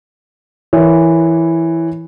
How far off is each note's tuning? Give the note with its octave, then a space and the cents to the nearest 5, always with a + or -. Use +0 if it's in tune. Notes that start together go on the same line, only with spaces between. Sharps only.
E3 +0 A#4 +0 C#5 +0